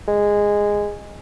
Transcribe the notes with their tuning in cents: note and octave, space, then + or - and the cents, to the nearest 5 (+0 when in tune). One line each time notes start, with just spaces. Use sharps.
G#3 -10